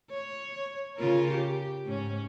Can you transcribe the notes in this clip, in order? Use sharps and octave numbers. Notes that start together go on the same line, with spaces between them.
C#5
C#3 F4 A#4
G4
G#2 C#4